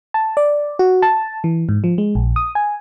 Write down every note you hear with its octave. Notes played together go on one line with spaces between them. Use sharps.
A5
D5
F#4
A5
E3
G#2
F3
G#3
A#1
D#6
G#5